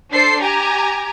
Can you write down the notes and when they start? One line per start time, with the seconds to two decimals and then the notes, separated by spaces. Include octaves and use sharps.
0.11 D4 A4 C5 C7
0.41 G4 G#5 A#5